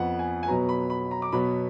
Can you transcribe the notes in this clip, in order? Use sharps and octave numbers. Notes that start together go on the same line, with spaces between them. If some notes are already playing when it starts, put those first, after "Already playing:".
Already playing: F2 F3 B3 B4 F#5
G#5
G#5
B2 F#3 B3 A#5
B5
B5
A#5
D6
B2 F#3 B3 B5